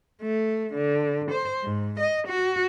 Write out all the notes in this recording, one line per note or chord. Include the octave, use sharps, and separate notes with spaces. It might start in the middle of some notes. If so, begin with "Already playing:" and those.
A3
D3
C5
G#2
D#5
F#4